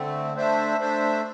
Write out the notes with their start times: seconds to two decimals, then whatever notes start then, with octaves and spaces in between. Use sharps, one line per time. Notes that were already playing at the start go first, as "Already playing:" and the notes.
Already playing: D3 A3 C4
0.34 A3 D4 C5 E5
0.78 A3 D4 C5 E5